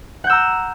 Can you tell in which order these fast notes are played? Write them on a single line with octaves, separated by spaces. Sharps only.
F#5 G6 E6 A#5